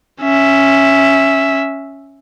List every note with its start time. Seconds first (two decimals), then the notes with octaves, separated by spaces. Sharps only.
0.22 C#4 E5